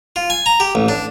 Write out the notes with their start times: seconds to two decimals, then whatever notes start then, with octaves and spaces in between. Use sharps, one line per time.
0.16 F4
0.30 G#5
0.46 A#5
0.60 G4
0.75 A1
0.88 D4